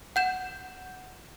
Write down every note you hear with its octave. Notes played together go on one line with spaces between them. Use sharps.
F#5 G6 E7